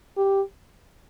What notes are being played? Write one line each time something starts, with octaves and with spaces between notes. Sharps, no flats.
G4